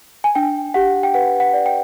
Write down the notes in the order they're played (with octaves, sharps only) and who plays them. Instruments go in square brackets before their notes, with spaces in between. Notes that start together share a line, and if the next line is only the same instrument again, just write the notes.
[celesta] G#5
D4 G5
G4 F#5
G5
B4 F#5
F#5
D5
G5